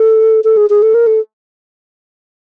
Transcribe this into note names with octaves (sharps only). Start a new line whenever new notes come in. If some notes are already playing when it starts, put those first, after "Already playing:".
Already playing: A4
A4
G#4
G#4
A4
A#4
A4